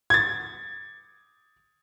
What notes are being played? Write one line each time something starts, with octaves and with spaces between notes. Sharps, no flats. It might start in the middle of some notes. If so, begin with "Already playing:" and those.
G#6 A6